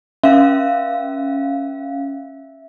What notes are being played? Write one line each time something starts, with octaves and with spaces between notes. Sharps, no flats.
C#4 E5 F5